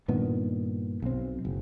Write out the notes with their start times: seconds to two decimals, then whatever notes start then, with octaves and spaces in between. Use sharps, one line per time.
0.08 G2 A#2 D#3 B3
1.02 B1 C4
1.45 F#1